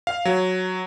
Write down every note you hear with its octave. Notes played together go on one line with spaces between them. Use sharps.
F5
F#3